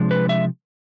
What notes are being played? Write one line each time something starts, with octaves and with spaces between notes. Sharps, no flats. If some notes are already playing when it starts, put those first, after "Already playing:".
Already playing: C3 F3 G#3 D4
B4
E5